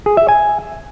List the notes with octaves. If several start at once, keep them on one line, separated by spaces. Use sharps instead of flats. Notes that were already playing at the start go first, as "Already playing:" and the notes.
G#4
E5
G#5